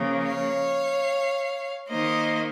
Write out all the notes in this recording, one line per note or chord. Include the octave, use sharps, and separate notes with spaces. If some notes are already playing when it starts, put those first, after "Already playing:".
Already playing: C#3 F3 A#3
C#5 F5
D#3 A#3 C5 D#5